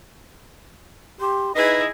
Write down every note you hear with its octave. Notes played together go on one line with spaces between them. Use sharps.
G4 C6
D#4 E4 G#4 B4 D#5